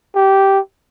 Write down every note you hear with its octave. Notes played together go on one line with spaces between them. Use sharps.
G4